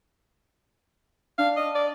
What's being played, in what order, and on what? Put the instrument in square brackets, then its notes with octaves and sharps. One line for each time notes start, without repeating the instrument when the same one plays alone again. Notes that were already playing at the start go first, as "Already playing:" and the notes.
[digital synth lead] D4 [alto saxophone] F5
[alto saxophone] D#5
D5